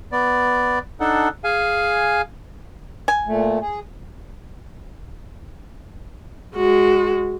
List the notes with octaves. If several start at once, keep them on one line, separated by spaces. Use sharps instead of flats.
B3 D5
D4 D#4 A4 F#5
G#4 F5 G#5
G#5
A#2 A3
G#4
G#3 F#4